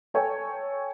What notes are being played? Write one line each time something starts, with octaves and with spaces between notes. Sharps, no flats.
A4 C#5 G5 G#5